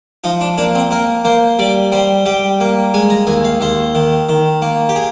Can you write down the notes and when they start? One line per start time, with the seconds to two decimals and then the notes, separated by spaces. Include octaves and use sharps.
0.24 F3 D#4
0.41 D4
0.58 A#3 D4
0.75 C4
0.91 A#3 A#4
1.24 A#3 C5
1.59 G3 D5
1.92 G3 C5
2.26 G3 G5
2.60 A#3
2.94 G#3 G#5
3.10 A#5
3.27 D#2 G#5
3.45 F5
3.61 D#2 C5
3.95 D#3
4.29 D#3
4.62 A#3
4.89 G4
4.96 G#4